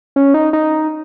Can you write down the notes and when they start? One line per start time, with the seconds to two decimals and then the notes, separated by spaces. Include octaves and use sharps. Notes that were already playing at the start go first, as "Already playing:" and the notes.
0.16 C#4
0.34 D#4
0.53 D#4